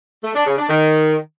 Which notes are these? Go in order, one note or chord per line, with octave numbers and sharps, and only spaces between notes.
A3
D4
C#3
D4
D#3